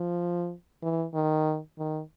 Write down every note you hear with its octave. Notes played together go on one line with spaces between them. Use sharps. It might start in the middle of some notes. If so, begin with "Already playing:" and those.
Already playing: F3
E3
D#3
D#3